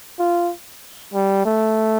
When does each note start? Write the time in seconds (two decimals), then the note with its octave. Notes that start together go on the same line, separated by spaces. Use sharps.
0.19 F4
1.14 G3
1.45 A3